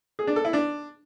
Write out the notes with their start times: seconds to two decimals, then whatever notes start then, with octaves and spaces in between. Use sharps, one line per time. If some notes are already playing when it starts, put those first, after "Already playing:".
0.19 G#4
0.27 D4
0.36 A4
0.45 E4
0.53 D4